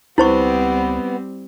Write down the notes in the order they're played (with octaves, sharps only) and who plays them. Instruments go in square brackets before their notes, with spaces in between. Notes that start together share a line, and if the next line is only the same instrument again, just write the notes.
[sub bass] C#2 [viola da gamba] G3 C4 [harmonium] B3 [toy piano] E4 C5 C#6